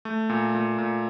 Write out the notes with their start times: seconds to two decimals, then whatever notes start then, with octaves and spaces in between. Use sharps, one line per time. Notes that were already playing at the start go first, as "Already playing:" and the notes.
0.05 A3
0.30 A#2
0.55 A#2
0.78 A#2